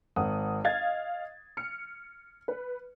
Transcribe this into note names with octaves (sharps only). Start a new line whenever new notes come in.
G#1 F#5 D#6
D#5 F5 G#6 A6
F6 C#7
B4